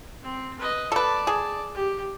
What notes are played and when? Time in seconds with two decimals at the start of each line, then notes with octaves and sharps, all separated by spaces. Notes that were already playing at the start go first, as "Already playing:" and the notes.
0.23 C4
0.59 B4 D#5
0.92 A4 B4 D5 A5
1.27 G#4
1.74 G4